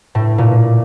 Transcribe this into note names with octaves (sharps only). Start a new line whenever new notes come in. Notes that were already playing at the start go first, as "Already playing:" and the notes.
A2
A#2